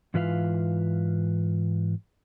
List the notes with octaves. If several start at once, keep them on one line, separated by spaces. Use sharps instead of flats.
G#2 E3 F4 B4 E5 F5